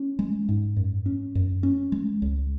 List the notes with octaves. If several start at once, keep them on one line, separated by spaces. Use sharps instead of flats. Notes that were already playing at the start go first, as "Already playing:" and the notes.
Already playing: C#4
G#3
G#2
F#2
C#4
F#2
C#4
G#3
C#2